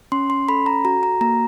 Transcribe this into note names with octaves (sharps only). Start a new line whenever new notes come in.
C#4 C6
C6
A4 B5
A#5
F#4 A#5
A#5
A#3 A#5